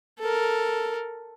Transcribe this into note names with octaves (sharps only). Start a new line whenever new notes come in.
A4 A#4